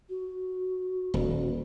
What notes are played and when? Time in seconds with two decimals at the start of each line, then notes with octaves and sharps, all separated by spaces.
0.09 F#4
1.14 D#1